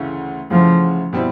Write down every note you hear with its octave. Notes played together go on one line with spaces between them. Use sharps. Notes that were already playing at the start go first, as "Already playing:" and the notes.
Already playing: D2 C#3 E3 A3 C#4
D2 C#3 E3 F3 A3 C#4
B2 G3 C4 E4